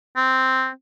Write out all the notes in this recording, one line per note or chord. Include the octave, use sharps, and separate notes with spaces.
C4